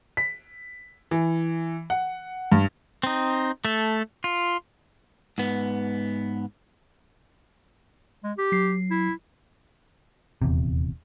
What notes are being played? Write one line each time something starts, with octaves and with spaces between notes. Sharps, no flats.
B6
E3
F#5
G2
C4 D#4
A3 A4
F4
G#2 B3
G#3
G4
F#3 C7
E4
D#1 E2 C3